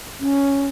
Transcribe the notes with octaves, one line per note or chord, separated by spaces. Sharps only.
C#4